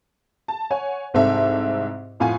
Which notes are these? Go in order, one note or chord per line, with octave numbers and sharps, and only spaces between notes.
A5
C#5 F#5 G#5
C2 G#2 C4 A4 E5
F2 A2 F4 F#5 G#5